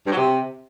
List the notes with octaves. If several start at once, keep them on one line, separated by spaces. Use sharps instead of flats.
G2
F#3
C3